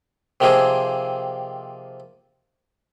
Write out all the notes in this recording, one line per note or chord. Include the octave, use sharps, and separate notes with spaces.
C3 D#3 F3 A#3 C4 G#4